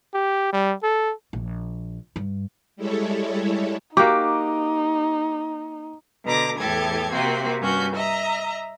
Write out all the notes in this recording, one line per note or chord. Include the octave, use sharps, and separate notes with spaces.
G4
G3
A4
A#1
G2
G3 G#3 E4 A4 C#5
A#3 D#4 F#4 G4 D6
B2 D3 A#5 D6 A#6
E2 A2 G4 A4 G#6
C3 A#3 C4 F#4
G2 C#4 F#4 G6
D#5 E5 A#5